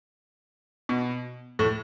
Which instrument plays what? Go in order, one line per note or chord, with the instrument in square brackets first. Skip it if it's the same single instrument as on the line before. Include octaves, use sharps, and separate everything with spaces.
[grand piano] B2
A2